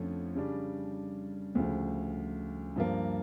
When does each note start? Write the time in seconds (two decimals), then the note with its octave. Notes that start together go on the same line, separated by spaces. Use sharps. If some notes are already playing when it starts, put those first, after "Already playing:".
Already playing: F2 D3 F3 A3 C#4
0.35 C#3 G3 D4
1.55 D2 C#3 F3
2.76 G2 F3 A#3